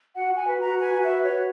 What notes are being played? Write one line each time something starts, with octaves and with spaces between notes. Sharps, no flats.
F#4 F#5
F#4
G#5
B4
F#4 A#5
B4 G#5
F#4
E5
B4
C#5
F#4